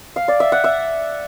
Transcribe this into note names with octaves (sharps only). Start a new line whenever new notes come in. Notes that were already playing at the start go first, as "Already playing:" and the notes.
F5
D5
E5
F#5
E5